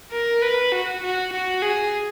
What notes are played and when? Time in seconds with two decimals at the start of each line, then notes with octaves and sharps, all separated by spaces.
0.12 A#4
0.42 B4
0.72 F#4
1.02 F#4
1.33 F#4
1.62 G#4